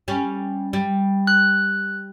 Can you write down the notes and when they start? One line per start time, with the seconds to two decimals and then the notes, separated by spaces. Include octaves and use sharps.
0.08 G3 C#4
0.73 G3
1.27 F#6